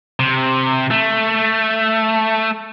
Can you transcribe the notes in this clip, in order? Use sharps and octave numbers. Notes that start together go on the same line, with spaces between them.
C3
A3